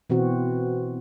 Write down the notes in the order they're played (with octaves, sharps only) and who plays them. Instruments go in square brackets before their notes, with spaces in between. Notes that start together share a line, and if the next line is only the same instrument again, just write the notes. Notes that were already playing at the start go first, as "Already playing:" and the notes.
[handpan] B2 E3 C4 F#4